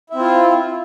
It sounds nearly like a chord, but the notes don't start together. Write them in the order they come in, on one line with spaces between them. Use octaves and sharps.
E4 C4 F4